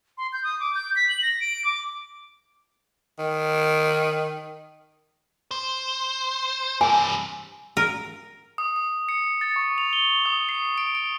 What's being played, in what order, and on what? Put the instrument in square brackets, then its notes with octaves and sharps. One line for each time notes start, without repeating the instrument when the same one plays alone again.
[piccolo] C6
G6
D#6
D6
G6
B6
F#7
A#6
D7
D6
[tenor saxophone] D#3
[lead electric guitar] C5
[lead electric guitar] G2 C3 [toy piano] G#5
[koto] A#4
[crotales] D#6
D#6
C#7
A6
C#6
F7
G7
D#6
C7
D7
D7